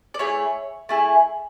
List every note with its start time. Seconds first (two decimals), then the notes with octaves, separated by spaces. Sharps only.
0.14 D5
0.19 A3 E4 G#4 C#5
0.89 A3 E4 G#4